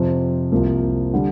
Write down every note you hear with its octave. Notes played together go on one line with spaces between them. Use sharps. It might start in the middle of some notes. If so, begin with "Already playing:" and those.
Already playing: F2 C3 F3
C2 C3 F3 A#3
D3 G3